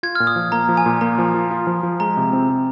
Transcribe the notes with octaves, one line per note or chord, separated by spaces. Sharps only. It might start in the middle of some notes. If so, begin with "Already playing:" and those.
F4 G#6
F6
A#2
D#6
F3
A#3 A#5
F3
G#5
A#2
A#3 A#5
F3
F4
F4
F3
F3
G#3 A#5
C3
C4
C3